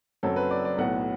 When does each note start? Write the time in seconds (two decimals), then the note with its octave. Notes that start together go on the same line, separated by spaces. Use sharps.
0.23 F#1 F#2 F#3 C4 A4
0.36 B4
0.51 D5
0.65 D5
0.78 B1 A2 F#3 B3 F#5